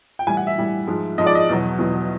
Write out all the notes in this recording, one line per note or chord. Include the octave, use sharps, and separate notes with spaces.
G5
A2 E3 G3 G#5
F#5
E5
A2 E3 G3
G#2 F3 G#3
G#2 F3 G#3 D#5
D5
D#5
E2 B2 F#3
E2 B2 F#3